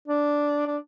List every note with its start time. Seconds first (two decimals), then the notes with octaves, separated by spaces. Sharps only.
0.08 D4
0.67 D4